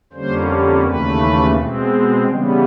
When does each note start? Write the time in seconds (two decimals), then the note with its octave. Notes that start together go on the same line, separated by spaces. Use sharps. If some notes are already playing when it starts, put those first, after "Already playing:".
0.12 F2 D3 G3 A#3 C#4 C5
0.83 D#2 C#3 E3 A3 B4
1.53 B2 G#3 C4
2.22 C#3 E3 G3 B3